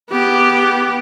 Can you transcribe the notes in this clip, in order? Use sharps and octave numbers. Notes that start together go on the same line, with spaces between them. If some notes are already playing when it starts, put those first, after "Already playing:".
B3 G4